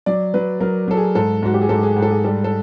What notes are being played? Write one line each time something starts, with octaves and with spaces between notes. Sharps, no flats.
F#3 D5
F#3 B4
F#3 A#4
F#3 A4
G#4
G#2 A4
G#2 F#4
G4
G#4
G#2 A4
G#4
G#2
A4
G#4
G3 A4
A4